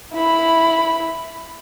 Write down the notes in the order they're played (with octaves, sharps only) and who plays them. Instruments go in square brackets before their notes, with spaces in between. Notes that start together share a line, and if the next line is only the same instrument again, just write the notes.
[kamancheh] E4 B5